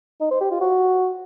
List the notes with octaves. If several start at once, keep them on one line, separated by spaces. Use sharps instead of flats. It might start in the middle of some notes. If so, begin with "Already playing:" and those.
D#4
C5
G4
F4
F#4